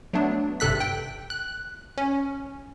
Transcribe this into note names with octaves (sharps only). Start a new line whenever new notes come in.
F#3 A3 B3 D4
G#1 G2 C3 A4 F#6 B6
G5
F#6
C#4